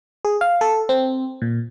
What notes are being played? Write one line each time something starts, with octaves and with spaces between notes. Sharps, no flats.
G#4
F5
A4
C4
A#2